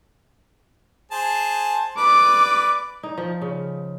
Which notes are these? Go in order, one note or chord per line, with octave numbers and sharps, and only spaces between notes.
G#4 C5 A5
B4 D5 D6
D#4
F3
C#3